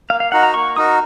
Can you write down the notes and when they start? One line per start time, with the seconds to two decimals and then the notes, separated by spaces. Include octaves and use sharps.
0.09 A#3 F5
0.20 F5
0.32 D#4 F#4 A#4 F#5
0.43 A#5
0.54 A#3 C#6
0.76 D#4 F#4 A#4 D#6